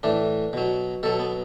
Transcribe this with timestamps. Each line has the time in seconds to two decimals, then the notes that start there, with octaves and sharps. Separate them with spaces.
0.03 A2 E3 D4
0.53 B2 F#3
1.03 B2 F#3 A4
1.19 B3